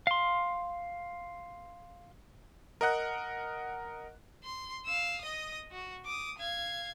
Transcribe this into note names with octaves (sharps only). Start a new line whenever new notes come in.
F5 C6
A#4 D#5 F#5 F#6
C6
F5 E6
D#5 D#6
F#4
D6 D#6
F5 G#6